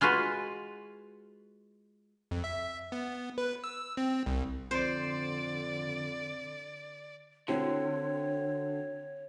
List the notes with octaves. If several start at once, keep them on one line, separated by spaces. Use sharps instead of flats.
G#3 F4 F#4 B4
F2
E5
B3
B4
E6
C4
C2
F2 D3 C5 D5
D3 F#3 C4 E4 C#5